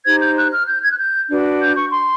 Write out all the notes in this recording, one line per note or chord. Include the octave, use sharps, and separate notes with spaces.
D#4 G4 C5 G#6
G6
F#6
F6
G6
G#6
F#6
G6
D4 F#4 B4
G6
C#6
C6